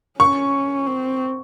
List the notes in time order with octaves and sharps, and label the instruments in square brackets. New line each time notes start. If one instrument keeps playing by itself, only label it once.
[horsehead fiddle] C#4 [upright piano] C#6
[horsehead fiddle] C4